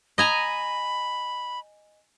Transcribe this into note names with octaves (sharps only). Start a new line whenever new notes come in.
D#5 G#5 A#5 B5